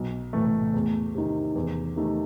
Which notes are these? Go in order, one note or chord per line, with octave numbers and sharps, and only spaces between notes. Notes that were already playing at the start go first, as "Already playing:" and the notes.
Already playing: B1
A2 E3 A3
E2
C3 D#3
E2
C3 D#3 A3